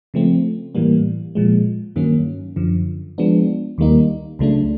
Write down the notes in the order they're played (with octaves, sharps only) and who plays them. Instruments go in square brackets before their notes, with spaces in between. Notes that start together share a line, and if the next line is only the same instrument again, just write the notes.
[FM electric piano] C#3 F3 A3 C4
A2 E3 G3 A#3
A#2 F3 G#3
G2 D#3 F#3 A#3 C#4
F#2 D3 F3
F3 G#3 B3 D4
D#2 D#3 G3 A#3 D#4
C#2 C#3 F#3 A3 D4